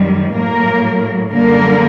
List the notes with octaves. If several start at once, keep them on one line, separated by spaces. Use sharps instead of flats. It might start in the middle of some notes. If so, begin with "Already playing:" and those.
Already playing: F#2 D#3 G3
A2 F#3 A#3 A#4
F#2 D3 G3 A#3 A#4